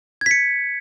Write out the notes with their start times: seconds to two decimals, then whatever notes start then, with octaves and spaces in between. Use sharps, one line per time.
0.21 G#6
0.26 B6
0.31 C#7